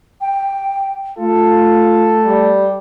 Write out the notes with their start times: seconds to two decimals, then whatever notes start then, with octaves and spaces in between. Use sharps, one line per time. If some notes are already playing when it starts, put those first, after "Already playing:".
0.21 G5
1.18 A3 F4 A4
2.25 G3